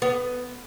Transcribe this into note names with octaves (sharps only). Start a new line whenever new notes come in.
B3